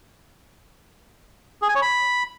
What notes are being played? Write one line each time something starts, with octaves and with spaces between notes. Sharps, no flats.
G#4
G#5
C#5
B5